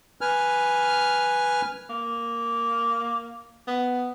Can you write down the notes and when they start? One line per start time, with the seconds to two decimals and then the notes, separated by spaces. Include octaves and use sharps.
0.21 B4 G#5 F6
1.90 A#3
3.68 B3